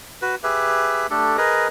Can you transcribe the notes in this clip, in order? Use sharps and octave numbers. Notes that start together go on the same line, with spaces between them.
F#4 B4
G4 G#4 B4 E5
A3 D4 G4 A4
G#4 A#4 B4 D#5